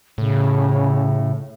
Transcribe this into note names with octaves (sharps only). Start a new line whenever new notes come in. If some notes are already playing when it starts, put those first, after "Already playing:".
A2 C#3